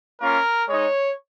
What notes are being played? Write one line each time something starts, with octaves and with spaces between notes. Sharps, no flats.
A#3 C#4 F4 A#4
G#3 D#4 C#5